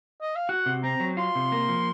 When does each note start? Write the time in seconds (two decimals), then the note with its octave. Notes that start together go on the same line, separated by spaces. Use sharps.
0.21 D#5
0.36 F5
0.49 F#4 F#5
0.66 C3
0.84 C4 A#5
1.00 F#3
1.17 F4 C6
1.35 C3
1.52 A#3
1.69 F3